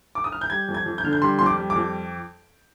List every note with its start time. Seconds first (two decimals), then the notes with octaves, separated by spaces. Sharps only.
0.15 D6
0.24 D#6
0.32 F6
0.41 G6
0.50 G3 G#6
0.68 F2
0.74 G#6
0.86 F2
0.98 G6
1.04 D3 F6
1.13 G6
1.22 G3 C6
1.39 F2 C6
1.46 D6
1.58 G3
1.70 D6
1.76 F2